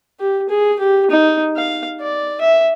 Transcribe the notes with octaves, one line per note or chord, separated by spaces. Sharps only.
G4
G#4
G4
D#4
F5
D5
E5